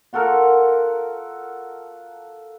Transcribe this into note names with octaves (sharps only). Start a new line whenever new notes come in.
F4 F#4 A4 A#4